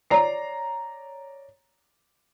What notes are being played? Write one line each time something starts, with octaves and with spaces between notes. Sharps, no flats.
C#5 D5 A#5 C7